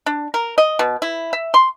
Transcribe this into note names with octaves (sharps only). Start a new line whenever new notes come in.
D4
A#4
D#5
B2
E4
E5
C6